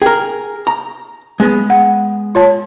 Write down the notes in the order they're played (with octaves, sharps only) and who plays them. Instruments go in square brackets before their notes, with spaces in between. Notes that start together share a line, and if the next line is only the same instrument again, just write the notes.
[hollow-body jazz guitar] G#4 A#4 [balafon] G5
[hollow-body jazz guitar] A#5
G#3 B3
[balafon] F#5
F4 C#5 A5